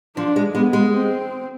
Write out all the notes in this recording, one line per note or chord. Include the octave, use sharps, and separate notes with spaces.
F3 D4
G#3
G#3 B3
G#3
C4